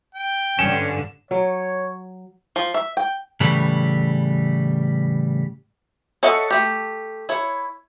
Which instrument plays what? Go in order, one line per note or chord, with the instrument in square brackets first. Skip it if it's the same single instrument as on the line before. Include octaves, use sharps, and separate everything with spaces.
[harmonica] G5
[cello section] G2 D3 [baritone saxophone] C#4 [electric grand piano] E7
[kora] F#3 [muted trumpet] C#5
[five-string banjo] F3
E5
G5
[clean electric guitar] A2 C#3 E3 G3
[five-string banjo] A4 C#5 D#5 E5 F#5
A3 G4
E4 C#5